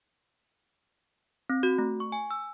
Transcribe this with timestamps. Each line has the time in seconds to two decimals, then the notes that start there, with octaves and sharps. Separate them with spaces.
1.50 C4
1.63 F#4
1.78 A3
2.00 C#6
2.12 G#5
2.31 E6